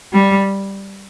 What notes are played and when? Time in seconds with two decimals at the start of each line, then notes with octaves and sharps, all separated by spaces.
0.13 G3